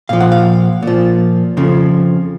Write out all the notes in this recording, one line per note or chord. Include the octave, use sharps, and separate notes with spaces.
A#2 F3 F5
F#5
F5
A#2 F3
F2 C#3 F3